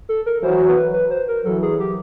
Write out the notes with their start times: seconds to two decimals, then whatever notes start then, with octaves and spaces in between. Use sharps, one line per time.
0.09 A4
0.26 A#4
0.42 E3 F#3 C5
0.68 B4
0.93 B4
1.11 C5
1.28 A#4
1.45 E3 F#3 A4
1.62 G#4
1.80 G4